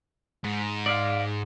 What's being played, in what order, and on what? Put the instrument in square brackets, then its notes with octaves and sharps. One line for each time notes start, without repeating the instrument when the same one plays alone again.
[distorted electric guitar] G#2
[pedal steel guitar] D5 F5